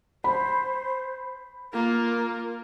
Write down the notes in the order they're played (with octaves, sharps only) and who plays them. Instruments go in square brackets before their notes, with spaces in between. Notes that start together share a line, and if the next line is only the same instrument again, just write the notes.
[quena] C5 [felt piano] B5
[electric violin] A#3 F4 [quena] A#4